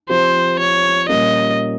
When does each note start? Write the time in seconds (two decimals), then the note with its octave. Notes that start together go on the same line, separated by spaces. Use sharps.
0.09 F3 C4 G4 C5
0.59 C#5
1.09 A#2 G3 A#3 C#4 D#5